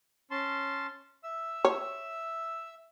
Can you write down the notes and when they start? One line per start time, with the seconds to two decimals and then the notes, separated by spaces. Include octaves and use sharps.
0.31 C#4 A5 C6
1.24 E5 E6
1.65 C#5